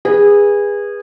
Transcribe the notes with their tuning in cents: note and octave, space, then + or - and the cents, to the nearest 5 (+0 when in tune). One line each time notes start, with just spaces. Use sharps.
G#4 -20 B4 -15